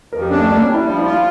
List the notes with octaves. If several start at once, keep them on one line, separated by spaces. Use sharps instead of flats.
F2 A#4
G4
C#4 D4
A3
G3 A#3
C#4
G3
E4
F3 D4
E4
F4
E4